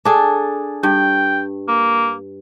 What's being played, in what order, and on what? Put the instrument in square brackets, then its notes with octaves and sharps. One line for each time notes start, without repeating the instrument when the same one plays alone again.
[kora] D4 G#4 A4
[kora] G2 [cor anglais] G5
[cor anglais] A#3